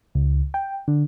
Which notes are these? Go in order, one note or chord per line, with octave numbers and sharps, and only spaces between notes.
C#2
G5
D3